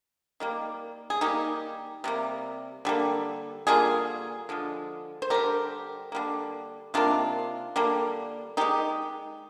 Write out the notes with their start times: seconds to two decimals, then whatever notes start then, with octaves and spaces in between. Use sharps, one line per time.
0.40 D#3 G3 A#3
1.10 G#4
1.21 D#3 G3 A#3 D#4 G4
2.04 C3 G3 A#3
2.85 D3 G3 A#3
3.67 D3 G3 A#3 F4 G#4
4.49 D3 F3 G#3
5.22 C5
5.30 D3 G3 A#3 G4 A#4
6.12 D3 G3 A#3
6.94 C3 D#3 A#3 D4 F4
7.76 D3 G3 A#3
8.57 D#3 G#3 D#4 G4